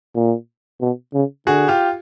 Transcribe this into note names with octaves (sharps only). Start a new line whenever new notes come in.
A#2
B2
C#3
D3 F#4 G#4
F4 G4